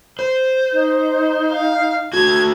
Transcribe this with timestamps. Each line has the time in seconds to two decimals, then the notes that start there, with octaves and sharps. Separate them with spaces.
0.19 C5
0.73 D#4
1.51 F5
2.13 A3 F#4 G#6